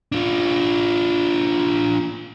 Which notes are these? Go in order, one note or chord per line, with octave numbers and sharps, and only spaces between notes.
D4 F4